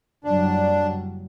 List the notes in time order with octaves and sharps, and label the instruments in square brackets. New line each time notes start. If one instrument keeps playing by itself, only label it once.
[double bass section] F#1 F#3 G3 [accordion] D4